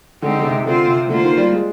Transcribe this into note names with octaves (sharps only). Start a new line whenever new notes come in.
D3 G#3 C4 D#4 G4
D3
C3
D3 C4 F4 C5
C3
D3 A#3 F4 C5
D#3
G3
G#3